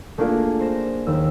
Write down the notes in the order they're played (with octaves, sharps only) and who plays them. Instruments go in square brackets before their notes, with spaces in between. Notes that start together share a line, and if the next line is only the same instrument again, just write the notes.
[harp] A3 A#3 D4 F4 G#4
C5 A#6 E7
D#2 E6